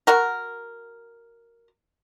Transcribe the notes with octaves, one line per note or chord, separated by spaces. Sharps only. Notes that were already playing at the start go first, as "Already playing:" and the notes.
F#4 A#4